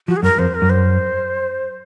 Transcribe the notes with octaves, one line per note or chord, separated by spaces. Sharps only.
F3 F#4
G#4
F#2 A#4
F2 C5
A#4
F#2
C5